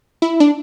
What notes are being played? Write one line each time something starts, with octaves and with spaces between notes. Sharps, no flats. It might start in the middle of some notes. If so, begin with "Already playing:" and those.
E4
D4